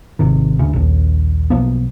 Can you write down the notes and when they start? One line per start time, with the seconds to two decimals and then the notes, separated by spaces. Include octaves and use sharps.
0.19 G#1 C3 D#3
0.59 D2 C#3
0.73 A#1 D#2
1.50 B1 F3 A#3 B3